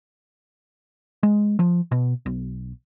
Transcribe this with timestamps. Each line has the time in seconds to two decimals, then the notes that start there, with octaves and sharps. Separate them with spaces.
1.23 G#3
1.59 F3
1.92 B2
2.26 B1